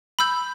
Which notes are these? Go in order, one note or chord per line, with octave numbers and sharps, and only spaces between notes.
B5 E6 G6